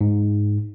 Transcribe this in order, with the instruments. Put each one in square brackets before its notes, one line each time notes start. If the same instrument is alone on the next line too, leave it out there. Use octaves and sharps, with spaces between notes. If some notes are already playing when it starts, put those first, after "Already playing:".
[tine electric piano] G#2